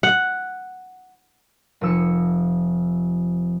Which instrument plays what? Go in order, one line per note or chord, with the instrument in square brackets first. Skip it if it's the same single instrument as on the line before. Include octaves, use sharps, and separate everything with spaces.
[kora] F#5
[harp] F1 F3 E6 C#7